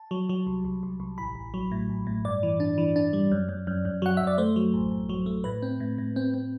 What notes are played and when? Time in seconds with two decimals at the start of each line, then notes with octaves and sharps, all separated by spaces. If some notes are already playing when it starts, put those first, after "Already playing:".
Already playing: A5
0.11 F#3
0.29 F#3
0.47 C2
0.65 C2
0.83 C2
1.00 C2
1.18 A1 B5
1.35 A1
1.54 F#3
1.71 A2
1.89 A1
2.07 A2
2.25 G2 D5
2.43 E3
2.60 D4
2.78 E3
2.96 D4
3.13 G3
3.31 F#2
3.49 F#2
3.67 F#2
3.85 F#2
4.02 F#3 F#5
4.17 F#2 E5
4.27 D5
4.38 A3 C5
4.56 F#3
4.73 A1
4.91 A1
5.09 F#3
5.26 A3
5.44 A2 B4
5.62 C4
5.80 A2
5.98 A2
6.16 C4
6.34 C4